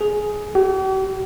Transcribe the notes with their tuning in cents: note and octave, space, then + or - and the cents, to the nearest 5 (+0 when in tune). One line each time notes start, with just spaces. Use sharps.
G#4 +10
G4 -45